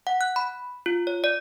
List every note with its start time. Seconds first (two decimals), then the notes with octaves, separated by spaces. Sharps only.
0.07 F#5
0.21 F#6
0.36 B5
0.86 F4
1.07 C#5
1.24 D5